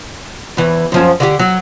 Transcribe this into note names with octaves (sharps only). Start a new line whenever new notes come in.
E2 E3
F#2 F3 C#4
D3 F#4 G4
F#3